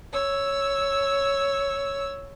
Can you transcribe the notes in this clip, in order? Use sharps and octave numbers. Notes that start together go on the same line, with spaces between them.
C#5 E6